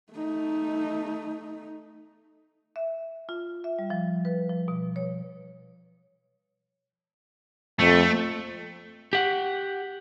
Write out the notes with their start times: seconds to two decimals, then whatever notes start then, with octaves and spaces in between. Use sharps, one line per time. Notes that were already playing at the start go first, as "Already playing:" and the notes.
0.13 A3 D#4
2.76 E5
3.29 F4
3.64 E5
3.79 G3
3.90 F3
4.25 B4
4.49 F3
4.68 B2
4.96 C#5
7.79 F2 A3
9.13 G4 F#5